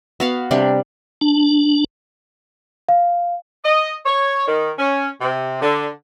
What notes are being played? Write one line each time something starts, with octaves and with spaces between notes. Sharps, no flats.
B3 F#4 F5
C3 G3 D4
D4
F5
D#5
C#5
D#3
C#4
C3
D3